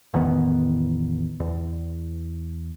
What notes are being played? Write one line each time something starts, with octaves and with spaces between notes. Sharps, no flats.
A1 E2 D#3 B3
E2